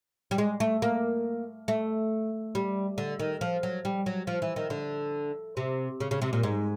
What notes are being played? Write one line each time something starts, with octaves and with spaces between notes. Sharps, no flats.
G3
G#3
A3
A#3
A3
G3
D3
D#3
F3
F#3
G3
F#3
F3
E3
D#3
D3
C3
C#3
C#3
C3
A#2
G#2